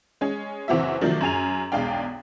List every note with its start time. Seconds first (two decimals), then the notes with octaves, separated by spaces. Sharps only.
0.21 G#3 C#4
0.68 F#1 E3 C4 F#4 E5
1.01 C3 D#3 F3 F#3 A3 D4
1.21 F#2 G#4 G#5 F7
1.72 B1 E2 G#3 D4 F5 G5